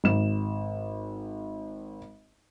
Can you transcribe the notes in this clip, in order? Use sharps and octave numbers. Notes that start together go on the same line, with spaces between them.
G#1 E7